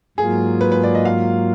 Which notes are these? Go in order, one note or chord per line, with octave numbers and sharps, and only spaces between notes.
G#2 F#3 A#3 F4 G#4
B4
B4
D5
D#5
F5